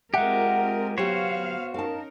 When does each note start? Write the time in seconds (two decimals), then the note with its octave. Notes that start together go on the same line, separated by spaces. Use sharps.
0.14 G#3 C4 F4 G4 A#4 E5 F#5
0.98 F#3 A#3 B3 F#4 G4 C5 C#5 F5
1.74 C#4 D#4 A#4 F5 A5